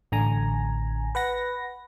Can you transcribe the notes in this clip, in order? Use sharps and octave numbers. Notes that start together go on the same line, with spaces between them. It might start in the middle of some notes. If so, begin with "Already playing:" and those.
A1 D3 G#5 A#5
B4 F#5 A#6